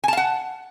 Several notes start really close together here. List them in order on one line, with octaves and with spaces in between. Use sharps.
G#5 A5 F5 F#5